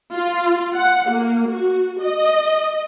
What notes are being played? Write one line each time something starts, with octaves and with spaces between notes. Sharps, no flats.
F4
F#5
A#3
F#4
D#5